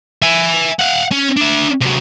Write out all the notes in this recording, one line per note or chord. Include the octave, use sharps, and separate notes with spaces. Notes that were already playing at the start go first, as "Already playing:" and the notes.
E5 G#5
F5 F#5
C#4
D4 E5
C3 F#3